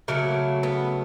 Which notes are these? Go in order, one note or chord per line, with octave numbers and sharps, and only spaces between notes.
C#3 F#3 A3 A#3
B3